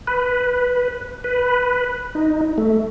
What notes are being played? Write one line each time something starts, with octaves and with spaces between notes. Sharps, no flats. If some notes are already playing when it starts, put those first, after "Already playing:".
B4
B4
D#4
A3